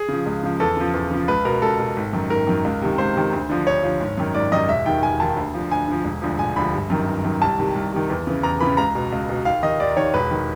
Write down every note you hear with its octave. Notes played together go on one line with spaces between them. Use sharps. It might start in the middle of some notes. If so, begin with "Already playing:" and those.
Already playing: G#4
C#3 F3
C#2
C#3 F3
E2 A4
C#3 F3
E2
C#3 F3
C#2 B4
B2 A#4
C#2 A4
B2
G#1
F#2 D#3
G#1 A#4
F#2 D#3
C#2
C3 D#3
C#2 C5
C3 D#3
D2
D3 F3
D2 C#5
D3 F3
G#1
F#2 D#3
G#1 D5
F#2 D#3 D#5
E1 E5
D#2 D#3 G5
E1 G#5
D#2 D#3 A5
D2
D3 F3
D2 G#5
D3 F3
E1
D2 D3 F3
E1 G#5
D2 D3 F3 B5
G1
F#2 D#3
G1
F#2 D#3
C2 A5
C3 D#3
C2
C3 D#3
E2
C#3 E3
E2 A#5
C#3 E3 B5
C#2 A#5
B2
C#2
B2
D#2 F5
D#3 D#5
D#2 D5
D#3 C#5
E1 B4
D#3